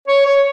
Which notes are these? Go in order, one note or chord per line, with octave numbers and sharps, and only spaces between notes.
C#5
C#5